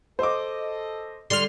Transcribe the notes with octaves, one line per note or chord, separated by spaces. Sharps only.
A4 C5 D#5 D6
D3 G3 C6 F6